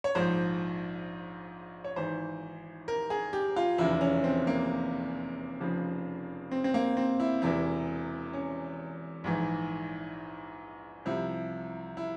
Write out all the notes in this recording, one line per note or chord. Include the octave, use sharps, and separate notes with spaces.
C#5
A#1 G#2 F3 C5
C#5
G#1 G#2 E3 C5
A#4
G#4
G4
F4
F1 E2 C#3 E4
C#4
C4
A#3
F1 F2 C#3 F3
C4
C4
A#3
C4
E4
E1 E2 C3 E3 E4
C#4
A#1 G#2 E3
C2 C3 F3 E4
E4